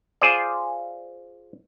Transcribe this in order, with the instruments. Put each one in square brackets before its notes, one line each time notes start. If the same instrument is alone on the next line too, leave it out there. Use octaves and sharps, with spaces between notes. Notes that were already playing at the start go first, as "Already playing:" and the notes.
[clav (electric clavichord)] F4 G#4 C5 D5